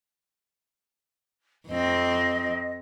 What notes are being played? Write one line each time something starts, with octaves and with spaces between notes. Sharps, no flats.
F2 C4 D#5